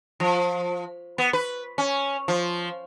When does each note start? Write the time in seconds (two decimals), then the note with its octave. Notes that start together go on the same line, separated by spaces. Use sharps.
0.20 F3
1.18 B3
1.33 B4
1.78 C#4
2.28 F3